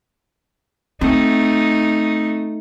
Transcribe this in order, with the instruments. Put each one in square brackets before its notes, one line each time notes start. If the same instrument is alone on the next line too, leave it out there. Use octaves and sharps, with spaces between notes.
[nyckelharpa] A3 D#4 [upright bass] C4